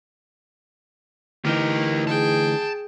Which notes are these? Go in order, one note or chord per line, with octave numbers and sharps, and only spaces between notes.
D2 E3 D#4 G4 A#4
G#4 G5 A5